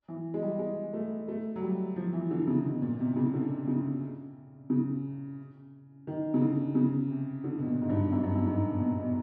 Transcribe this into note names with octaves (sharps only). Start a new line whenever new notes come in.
E3
G#3
G3
G#3
A3
A3
F#3
G3
F3
E3
D3
C#3
B2
A#2
B2
C3
C3
C#3
D3
C#3
C#3
D#3
C#3
D3
C#3
C3
D3
B2
A#2
G#2
G2
F#2
G2
F#2
G#2
B2
A#2
B2